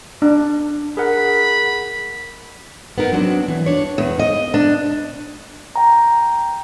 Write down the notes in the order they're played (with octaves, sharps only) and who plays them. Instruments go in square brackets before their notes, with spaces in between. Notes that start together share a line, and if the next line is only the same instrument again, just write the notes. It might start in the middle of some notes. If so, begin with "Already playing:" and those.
[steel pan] D4
[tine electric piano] G#4 A#4 F#5 [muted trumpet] B5
[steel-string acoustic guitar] B3 D#4 A#4
F#3 C4 D4 F#4
E3
D4 C#5
E2
D#5
D4
[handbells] G5 A#5